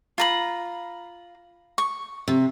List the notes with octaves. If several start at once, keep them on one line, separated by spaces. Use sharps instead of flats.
F4 A#5 B5
C#6
C3